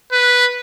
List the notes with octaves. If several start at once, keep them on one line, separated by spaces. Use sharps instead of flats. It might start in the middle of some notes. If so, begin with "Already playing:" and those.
B4